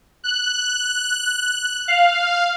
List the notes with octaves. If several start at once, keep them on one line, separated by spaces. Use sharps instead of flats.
F#6
F5